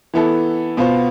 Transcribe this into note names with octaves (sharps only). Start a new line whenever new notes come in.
E3 B3 E4 A4
B2 B3 F4 C5